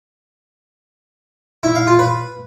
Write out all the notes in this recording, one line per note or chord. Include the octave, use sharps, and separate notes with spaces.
E4
F5
F4
B4